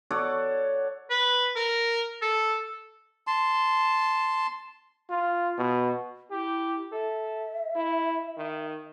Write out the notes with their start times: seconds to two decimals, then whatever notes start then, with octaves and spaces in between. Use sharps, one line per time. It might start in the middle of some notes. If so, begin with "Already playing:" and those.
0.11 A4 C#5 D5 F#5
1.10 B4
1.56 A#4
2.22 A4
3.27 A5 C6
5.10 F4
5.58 B2
6.31 E4 G4
6.92 A4 E5
7.76 E4
8.37 D#3